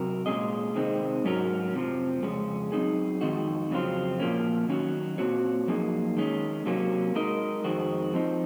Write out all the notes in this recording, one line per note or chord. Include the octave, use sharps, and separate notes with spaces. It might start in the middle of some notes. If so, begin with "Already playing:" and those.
Already playing: C3 F#3 F#4 A#4
A#2 G#3 C#4 G#4 D#5
C3 D#3 G#3 C4 D#4
G#2 F#3 C#4 F#4 A#4
F2 C3 F3
F2 C#3 G#3 C#4
F#2 F3 C4 D#4 G#4
F2 D#3 G#3 D#4 F#4
F2 C#3 F#3 C4 F4
A#2 F3 A#3 C#4
D#3 F#3 C#4 F#4
A#2 F3 C4 F#4 C#5
F#2 F3 A#3 D#4 G#4
D#3 G#3 C#4
C3 F#3 A#3 C#4
G#3 D#4 A#4 D#5
F2 D#3 G#3 C4 F#4
F3 C4 D#4